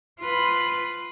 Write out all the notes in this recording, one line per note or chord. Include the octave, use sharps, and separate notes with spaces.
F4 B4